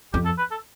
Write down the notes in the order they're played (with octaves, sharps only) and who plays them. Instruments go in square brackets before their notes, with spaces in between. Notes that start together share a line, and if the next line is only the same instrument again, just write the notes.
[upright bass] F2 [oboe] G4
[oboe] A4
B4
A4